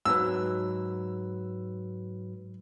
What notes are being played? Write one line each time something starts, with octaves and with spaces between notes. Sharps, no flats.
G#2 F#3 B4 E6